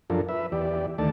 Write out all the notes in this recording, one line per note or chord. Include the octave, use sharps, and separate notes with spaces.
F#2 F3 D4 F4 A4 A#4
B4 E5
E2 G4 D5
D2 D#3 A3 D5 A5